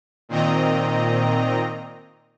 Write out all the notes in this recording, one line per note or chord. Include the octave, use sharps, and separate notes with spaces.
A#2 D#3 C4 D#5 A#5